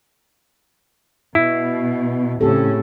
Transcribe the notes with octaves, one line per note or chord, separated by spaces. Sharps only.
B2 E4
A2 C#3 C4 C#4 G4 A4